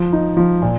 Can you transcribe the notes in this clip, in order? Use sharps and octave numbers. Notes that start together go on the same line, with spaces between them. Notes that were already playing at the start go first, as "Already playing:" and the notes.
Already playing: F3
D#4
F3
A#2